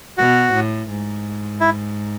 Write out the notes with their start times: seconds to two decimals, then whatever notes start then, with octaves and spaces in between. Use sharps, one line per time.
0.18 B2 F#4
0.53 A2
0.90 G#2
1.60 E4